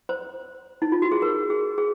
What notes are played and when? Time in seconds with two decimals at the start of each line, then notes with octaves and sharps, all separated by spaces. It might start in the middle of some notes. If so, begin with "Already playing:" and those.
0.09 C5
0.82 D#4
0.92 F4
1.02 F#4
1.12 G#4
1.22 A#4
1.50 G#4
1.78 G#4